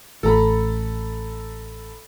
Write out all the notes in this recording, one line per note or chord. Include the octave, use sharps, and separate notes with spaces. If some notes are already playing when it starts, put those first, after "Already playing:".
A1 A4 A#5 B5